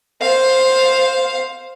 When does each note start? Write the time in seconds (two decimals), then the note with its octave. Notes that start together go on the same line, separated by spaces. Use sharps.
0.21 C5 F5